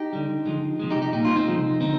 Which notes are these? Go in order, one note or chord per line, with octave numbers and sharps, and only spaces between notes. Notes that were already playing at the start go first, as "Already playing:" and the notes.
Already playing: D#4 G4
D3 G3
D3 F3 G#3
C3 F3 G#3
D#4 G4
D#4 G4
A#2 G3 D#4
F4
C4 D#4
C3 F3 G#3
D3 G#3 C4 D#4